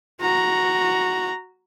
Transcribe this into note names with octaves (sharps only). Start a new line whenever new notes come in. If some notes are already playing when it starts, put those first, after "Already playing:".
F#4 A#5